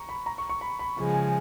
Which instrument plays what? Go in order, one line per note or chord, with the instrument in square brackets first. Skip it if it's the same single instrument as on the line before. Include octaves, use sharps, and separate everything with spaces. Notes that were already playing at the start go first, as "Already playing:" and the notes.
Already playing: [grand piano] A#5 C#6
B5
A#5
C#6
C#6
B5
B5
[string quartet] C#3 F3 G#3 [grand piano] B5
[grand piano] G#5